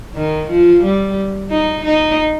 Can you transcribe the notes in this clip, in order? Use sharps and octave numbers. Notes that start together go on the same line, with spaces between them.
D#3
F3
G3
D#4
D#4